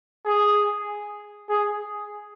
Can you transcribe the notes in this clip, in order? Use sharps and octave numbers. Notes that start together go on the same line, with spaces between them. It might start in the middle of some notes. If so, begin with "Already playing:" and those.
G#4
G#4